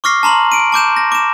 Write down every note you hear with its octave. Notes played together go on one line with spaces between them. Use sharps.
C#6 D6 F6 A#6 C7
A5 A#5 C6 F#7
D7 D#7
A5 D6 G6 E7
A#6
D6 E7